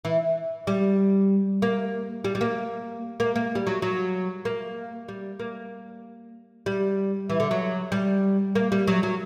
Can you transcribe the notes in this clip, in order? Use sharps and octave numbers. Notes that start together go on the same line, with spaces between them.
E3
G3
A#3
G3
G3
A#3
A#3
A#3
G3
F#3
F#3
A#3
G3
A#3
G3
E3
D3
F#3
G3
A#3
G3
F#3
F#3